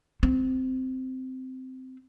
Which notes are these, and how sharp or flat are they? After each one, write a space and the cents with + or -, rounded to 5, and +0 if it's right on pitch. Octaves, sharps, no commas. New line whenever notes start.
C4 -15